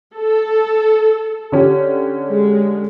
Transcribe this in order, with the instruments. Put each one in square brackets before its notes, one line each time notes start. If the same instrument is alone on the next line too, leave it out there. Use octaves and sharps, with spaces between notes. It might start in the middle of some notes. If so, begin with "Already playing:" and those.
[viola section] A4
[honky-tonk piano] D3 C#4 G4
[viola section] G#3